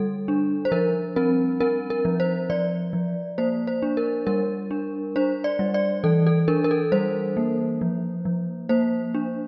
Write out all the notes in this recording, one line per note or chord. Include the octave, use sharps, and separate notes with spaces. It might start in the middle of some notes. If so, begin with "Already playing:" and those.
Already playing: D3 G3 A4
D4
C5
F3 A#4
C4 A#4
C4 A#4
A#4
F3
C5
F3 D5
F3
A#3 C5
C5
D4
A#4
G3 A#4
D4
D4 C5
D5
G3
D5
E3 A4
A4
D4 A#4
A#4
A4
G3 C5
A#3
F3
F3
A#3 C5
D4